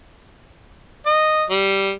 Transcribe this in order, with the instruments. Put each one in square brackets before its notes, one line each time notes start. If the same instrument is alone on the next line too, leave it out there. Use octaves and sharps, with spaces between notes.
[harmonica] D#5
G3